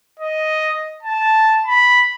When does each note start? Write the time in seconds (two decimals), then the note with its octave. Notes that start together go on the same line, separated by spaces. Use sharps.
0.19 D#5
1.03 A5
1.66 B5